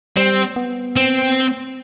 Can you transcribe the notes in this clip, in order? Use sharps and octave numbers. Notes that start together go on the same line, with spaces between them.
G3 C4
B3
C4